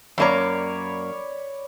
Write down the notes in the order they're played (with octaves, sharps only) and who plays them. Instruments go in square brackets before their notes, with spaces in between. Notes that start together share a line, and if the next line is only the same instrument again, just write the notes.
[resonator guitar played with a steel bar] F#2 A#3 A#5 [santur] C#5 D5 B5